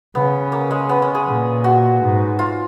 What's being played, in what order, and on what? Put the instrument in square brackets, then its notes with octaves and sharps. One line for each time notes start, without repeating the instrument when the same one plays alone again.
[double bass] C#3 [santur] B3
[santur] A#3
G#3
B3
C#4
G#4
[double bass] A#2
[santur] F#4
[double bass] G#2
[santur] F4